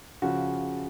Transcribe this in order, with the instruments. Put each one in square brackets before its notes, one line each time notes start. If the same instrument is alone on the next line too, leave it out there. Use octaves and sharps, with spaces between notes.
[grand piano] C#3 F3 F#4